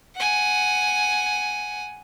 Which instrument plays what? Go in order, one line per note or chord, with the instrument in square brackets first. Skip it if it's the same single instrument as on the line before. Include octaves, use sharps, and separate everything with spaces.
[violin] F#5 G#5